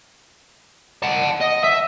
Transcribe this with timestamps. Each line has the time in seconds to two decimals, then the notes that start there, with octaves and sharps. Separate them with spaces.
1.03 F#5 A5
1.40 D#5
1.64 E5